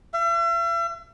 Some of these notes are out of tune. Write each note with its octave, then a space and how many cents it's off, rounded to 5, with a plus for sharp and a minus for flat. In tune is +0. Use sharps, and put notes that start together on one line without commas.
E5 +40